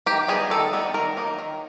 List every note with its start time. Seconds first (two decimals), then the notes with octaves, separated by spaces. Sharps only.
0.06 D#3 G4
0.28 G3 B3 D#4 G#4
0.50 D#3 A4
0.73 G3 B3 D#4
0.94 D#3 A#4
1.17 F#3 A#3 D#4
1.39 D#3